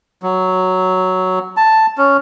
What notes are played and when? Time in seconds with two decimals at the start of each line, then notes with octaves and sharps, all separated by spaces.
0.23 F#3
1.57 A5
1.98 C#4